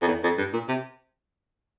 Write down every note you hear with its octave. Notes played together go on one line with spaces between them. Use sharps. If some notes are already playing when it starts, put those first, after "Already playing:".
F2
E2
F2
G2
A#2
C3